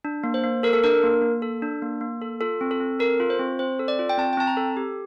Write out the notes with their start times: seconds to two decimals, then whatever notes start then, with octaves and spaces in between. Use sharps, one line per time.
0.05 D4
0.24 A#3
0.34 C5
0.44 A#3
0.63 A4 A#4
0.73 A4
0.84 D4 A#4
1.04 A#3
1.22 A#3
1.42 A4
1.62 D4
1.82 A#3
2.01 A#3
2.21 A4
2.41 F4 A4
2.61 C4
2.71 A4
2.80 C4
2.99 A4 A#4
3.20 F4
3.30 C5
3.39 C4
3.59 C4 C5
3.79 A4
3.88 D5
3.99 F4
4.09 G5
4.18 C4 A5
4.33 G5
4.37 C4 A5
4.47 A#5
4.57 A4
4.77 G4